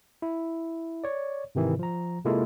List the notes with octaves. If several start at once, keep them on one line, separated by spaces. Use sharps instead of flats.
E4
C#5 D5
G#2 C3 D#3 E3
F3 A#5
C3 G#3 A#3 E4 F4 A4